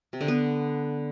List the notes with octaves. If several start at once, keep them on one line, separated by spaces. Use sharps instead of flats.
C3
D3
B3